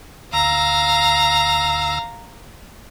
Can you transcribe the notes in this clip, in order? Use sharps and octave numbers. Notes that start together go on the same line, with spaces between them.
D2 F5 A#5 E6